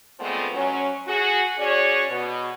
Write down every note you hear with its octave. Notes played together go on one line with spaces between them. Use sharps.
D3 F3 G#3 A3 B3 C4
F#3 C#4
F#4 G#4
C#4 F#4 G#4 C#5 D5
B2